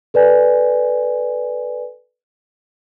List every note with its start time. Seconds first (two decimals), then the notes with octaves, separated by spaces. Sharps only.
0.14 A4 B4 D5 G#5